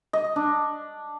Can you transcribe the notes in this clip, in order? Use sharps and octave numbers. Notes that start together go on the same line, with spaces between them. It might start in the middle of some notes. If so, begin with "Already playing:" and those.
D#5
D4